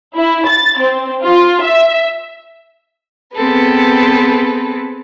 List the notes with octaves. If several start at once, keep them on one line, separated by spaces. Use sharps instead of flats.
E4
A6
C4
F4
E5
B3 C4 G#4 A4 B4